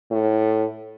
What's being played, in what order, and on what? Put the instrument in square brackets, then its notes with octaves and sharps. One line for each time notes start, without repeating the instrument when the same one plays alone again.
[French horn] A2